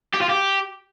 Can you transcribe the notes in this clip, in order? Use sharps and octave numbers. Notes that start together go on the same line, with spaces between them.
G4
F4
G4